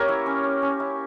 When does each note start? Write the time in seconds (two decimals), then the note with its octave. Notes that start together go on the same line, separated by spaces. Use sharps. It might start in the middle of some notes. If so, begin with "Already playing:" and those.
Already playing: A#3 C#4 G4 A#4 C#5
0.08 E4
0.26 C#4
0.43 C#4
0.62 C#4
0.80 E4